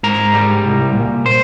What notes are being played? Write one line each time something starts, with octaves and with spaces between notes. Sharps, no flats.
G#2 A#4 A#5
G3
C2
A#2
C5 C6